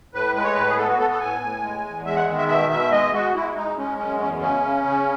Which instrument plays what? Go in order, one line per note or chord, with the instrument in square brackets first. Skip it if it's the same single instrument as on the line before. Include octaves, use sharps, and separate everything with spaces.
[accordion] A2 B4
G#3 B4
C#5
A2 B4
G#4
B3 A4
F#4
B3 A4
A4
A2 G#5
A2
G#3
E2
G#3 E5
F#5
D#3
E5
B2 E5
B2 E5
G#3 D#5
G#3 F#4
G#3 E4
G#3 D#4
G#3 C#4
F#2 C#4
E2 C#4
C#3 C#4
C#3
C#3